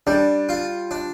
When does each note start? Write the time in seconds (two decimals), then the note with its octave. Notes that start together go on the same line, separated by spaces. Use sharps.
0.07 G3 D4
0.49 F4
0.91 D4